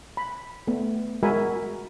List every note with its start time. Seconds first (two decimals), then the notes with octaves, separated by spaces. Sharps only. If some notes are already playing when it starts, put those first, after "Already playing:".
0.17 B5
0.67 A3 B3
1.23 G#3 F#4 A#4 E5 G#5 B5